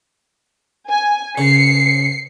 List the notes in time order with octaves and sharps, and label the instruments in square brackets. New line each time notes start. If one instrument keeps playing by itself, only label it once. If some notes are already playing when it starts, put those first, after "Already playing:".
[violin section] G#5
[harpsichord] C#3 [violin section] C7 C#7